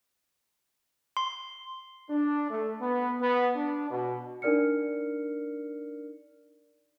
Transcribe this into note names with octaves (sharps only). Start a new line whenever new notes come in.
C6
D4
A3
B3
B3
D4
B2
D4 D#4 A#4 D5 F6 C#7